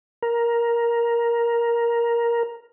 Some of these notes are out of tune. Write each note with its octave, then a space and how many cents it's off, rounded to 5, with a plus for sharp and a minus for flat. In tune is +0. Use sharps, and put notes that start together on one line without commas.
A#4 +10